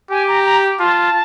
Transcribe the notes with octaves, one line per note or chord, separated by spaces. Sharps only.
G4 G#5
A#5
A#5
F4 A5